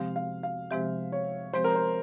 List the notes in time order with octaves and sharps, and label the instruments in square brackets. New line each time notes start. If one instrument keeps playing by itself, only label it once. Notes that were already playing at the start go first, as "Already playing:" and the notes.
Already playing: [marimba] C3 F3 G#3 C4 G4 [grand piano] F5
[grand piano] F5
F5
[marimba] C3 F3 G#3 C4 G4 [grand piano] E5
[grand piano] C#5
[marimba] F3 G#3 C4 G4 [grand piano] C5
[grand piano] A#4
C5